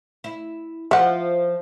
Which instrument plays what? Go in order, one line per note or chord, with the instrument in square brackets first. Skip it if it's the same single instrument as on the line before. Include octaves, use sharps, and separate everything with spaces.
[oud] E4
[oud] F3 [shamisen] E5 F#5